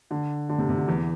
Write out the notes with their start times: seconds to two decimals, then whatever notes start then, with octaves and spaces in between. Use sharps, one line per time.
0.11 D3
0.49 D3
0.58 C3
0.69 C3
0.78 D3
0.87 E2 E3